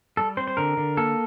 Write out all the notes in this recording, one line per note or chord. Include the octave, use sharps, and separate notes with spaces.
G3 A4
C4 C5
C5
D3 A#4
D3
A#3 A4